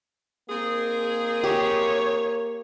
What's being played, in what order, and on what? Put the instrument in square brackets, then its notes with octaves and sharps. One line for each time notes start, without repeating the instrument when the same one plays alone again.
[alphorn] A#3 [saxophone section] C4 D#4 G#4
[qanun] G4 [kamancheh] C#5